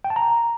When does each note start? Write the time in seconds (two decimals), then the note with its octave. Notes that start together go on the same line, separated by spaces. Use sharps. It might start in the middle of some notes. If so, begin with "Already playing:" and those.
0.04 G5
0.10 A5
0.16 A#5